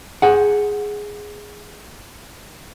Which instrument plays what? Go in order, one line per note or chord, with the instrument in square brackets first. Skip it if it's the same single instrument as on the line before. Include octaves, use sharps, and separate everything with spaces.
[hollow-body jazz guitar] G#4 F#5